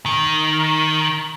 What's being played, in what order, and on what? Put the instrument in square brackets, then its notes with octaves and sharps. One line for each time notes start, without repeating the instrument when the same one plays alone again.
[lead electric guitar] D#3